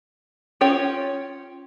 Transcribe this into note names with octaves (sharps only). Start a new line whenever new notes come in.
C#4 F4 C#5 G5